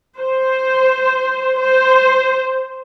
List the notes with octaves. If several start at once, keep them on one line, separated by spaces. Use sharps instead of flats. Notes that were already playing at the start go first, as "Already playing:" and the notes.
C5
C5